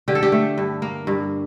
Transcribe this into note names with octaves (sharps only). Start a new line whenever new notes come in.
D3 G4
A4
G4
A3
G2
A#3
G2